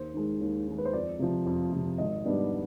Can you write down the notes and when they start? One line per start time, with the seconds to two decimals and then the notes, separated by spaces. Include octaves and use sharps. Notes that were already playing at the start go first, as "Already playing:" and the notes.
Already playing: D#2 C5
0.14 D#3 G#3
0.41 D#2
0.67 D#3 G#3
0.78 B4
0.85 C5
0.93 F2 D5
1.19 C3 F3
1.46 F2
1.72 C3 F3
1.98 G#1 D#5
2.25 G#2 G3 B3 D4